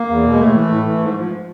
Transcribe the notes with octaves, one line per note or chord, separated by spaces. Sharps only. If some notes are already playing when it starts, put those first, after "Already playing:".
Already playing: A#3
E2
B2
G#3
A2 A3
E3
A2
E3
G#2
F3